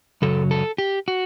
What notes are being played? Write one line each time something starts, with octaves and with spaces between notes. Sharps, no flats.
F#2 C#3 F#3 A4
A4
G4
F#4